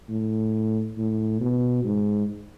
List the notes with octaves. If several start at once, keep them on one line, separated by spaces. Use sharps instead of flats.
A2
A2
B2
G#2